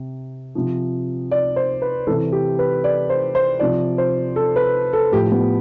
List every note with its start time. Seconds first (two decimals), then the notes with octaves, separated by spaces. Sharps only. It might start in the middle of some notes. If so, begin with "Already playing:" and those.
Already playing: C3
0.55 C3 F3
1.31 D5
1.56 C5
1.82 B4
2.07 C3 E3 A4
2.32 G4
2.59 B4
2.84 D5
3.10 C5
3.35 C5
3.59 C3 F3 D5
3.98 C5
4.36 A4
4.56 B4
4.93 A4
5.12 A2 F3 G4
5.32 B3